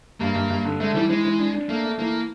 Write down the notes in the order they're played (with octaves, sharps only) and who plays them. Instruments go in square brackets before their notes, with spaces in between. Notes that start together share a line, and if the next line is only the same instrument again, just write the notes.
[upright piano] G2 [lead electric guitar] A#3
[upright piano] G2
G2
D3
[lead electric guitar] G#3 [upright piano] A3
[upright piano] E3 [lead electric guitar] G3
[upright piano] E3 [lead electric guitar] G#3
[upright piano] E3
D4
D4
[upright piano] A3 [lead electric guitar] A#3
[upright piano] A3
[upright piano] E3 [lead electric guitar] A#3